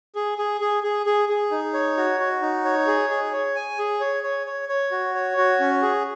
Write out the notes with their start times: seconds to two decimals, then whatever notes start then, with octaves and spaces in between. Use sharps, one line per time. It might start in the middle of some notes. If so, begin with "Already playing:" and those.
0.15 G#4
0.38 G#4
0.61 G#4
0.83 G#4
1.06 G#4
1.29 G#4
1.51 D#4
1.74 C#5
1.97 F#4
2.20 F#4
2.42 D#4
2.65 C#5
2.87 G#4
3.10 G#4
3.33 C#5
3.56 G#5
3.79 G#4
4.01 C#5
4.23 C#5
4.47 C#5
4.69 C#5
4.91 F#4
5.15 C#5
5.37 F#4
5.60 C#4
5.82 G#4